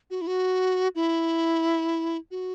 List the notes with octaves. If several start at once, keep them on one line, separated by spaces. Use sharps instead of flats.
F#4
E4
F#4
E4
F#4